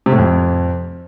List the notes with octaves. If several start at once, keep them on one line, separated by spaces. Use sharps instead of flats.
C3
A2
F2